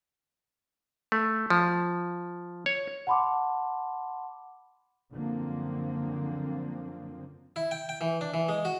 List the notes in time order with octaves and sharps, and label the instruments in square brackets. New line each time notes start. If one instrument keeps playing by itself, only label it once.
[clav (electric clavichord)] A3
F3
C#5
[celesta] F#5 A5 B5 C6 D6
[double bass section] F#2 D3 F3 A#3 C4
[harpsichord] E4
G5
G5
E3
D4
E3
G#3
F#4